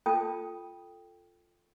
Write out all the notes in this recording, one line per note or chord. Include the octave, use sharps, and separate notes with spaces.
F4 A4 G5 A5 D#6